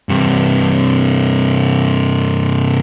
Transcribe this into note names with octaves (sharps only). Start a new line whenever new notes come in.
G2 C3